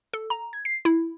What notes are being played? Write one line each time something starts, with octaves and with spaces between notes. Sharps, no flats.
A4
A#5
G#6
C7
E4